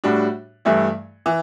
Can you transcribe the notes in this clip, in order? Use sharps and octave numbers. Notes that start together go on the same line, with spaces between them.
A2 G3 D4 F#4
G2 E3 A3 E4
E3